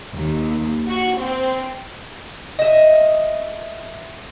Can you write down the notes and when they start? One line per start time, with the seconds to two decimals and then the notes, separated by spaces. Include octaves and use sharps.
0.13 D#2
0.87 F#4
1.17 C4
2.59 D#5 E5